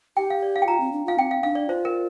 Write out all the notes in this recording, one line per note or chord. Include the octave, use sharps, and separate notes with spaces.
G4 G5
F5
D5
F5
G5
F4 A#5
C4
D4
F4 F5
C4 G5
F5
D4 F5
D5
F4 C5
A#4